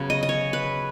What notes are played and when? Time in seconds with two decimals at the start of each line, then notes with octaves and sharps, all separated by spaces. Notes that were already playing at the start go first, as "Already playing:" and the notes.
Already playing: C#3 F#3 B3
0.10 D#5
0.23 D#5
0.29 C#5
0.53 B4